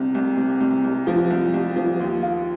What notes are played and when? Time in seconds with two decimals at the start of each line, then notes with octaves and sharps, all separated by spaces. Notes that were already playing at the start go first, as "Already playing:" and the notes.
Already playing: C2 C3
0.14 C2
0.37 C3
0.60 C2
0.84 C2
1.07 F3
1.30 C2
1.54 C2
1.76 F3
2.00 D#2
2.22 F4